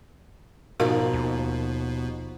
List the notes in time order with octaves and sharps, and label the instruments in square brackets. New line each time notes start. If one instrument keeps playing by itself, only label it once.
[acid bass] G#2 [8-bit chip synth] B2 [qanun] F3 D#4 D5 [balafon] F#4 A#4 F5
[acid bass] D#2